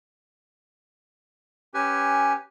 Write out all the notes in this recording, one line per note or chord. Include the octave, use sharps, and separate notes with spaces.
C#4 G4 B4 G#5